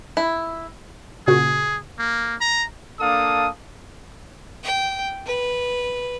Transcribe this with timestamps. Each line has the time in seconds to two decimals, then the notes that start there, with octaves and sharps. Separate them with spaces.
0.17 E4
1.27 A#2 C#3 F#4 G#4
1.99 A#3
2.41 A#5
3.00 A#3 D4 A4 F5 A5 D#6
4.64 G5
5.26 B4